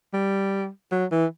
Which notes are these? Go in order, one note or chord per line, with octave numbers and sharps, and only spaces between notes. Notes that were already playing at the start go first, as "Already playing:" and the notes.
G3
F#3
E3